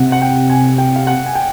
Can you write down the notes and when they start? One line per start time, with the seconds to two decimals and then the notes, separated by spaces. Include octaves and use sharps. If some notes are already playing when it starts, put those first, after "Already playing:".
Already playing: C3 F#5
0.12 F#5
0.22 G5
0.50 G#5
0.78 G5
0.96 F5
1.07 F#5
1.26 G#5
1.35 G5